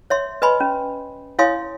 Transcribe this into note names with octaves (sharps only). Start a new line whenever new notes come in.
C#5 E5 C6
B4 D#5 G#5 B5 C6
C#4
E4 C#5 F5 G#5 C6 D#6